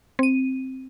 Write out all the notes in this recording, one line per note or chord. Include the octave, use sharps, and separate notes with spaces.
C4 D#7